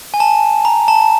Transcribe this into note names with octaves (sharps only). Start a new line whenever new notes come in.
G#5
A5
A#5
A5